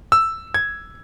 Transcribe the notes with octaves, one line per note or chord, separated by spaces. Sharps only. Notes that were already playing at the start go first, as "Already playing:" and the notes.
E6
G#6